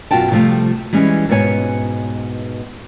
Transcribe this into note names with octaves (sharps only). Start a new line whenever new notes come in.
F#2 B2 F4 F#4 G5 A5
C3 F3 G3 A3 F4
E3 G3 G#3 C#4
G#2 B2 B3 C#5 G#5